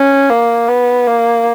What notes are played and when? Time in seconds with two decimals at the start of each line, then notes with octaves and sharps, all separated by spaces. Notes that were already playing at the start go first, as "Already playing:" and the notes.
Already playing: C#4
0.30 A#3
0.69 B3
1.07 A#3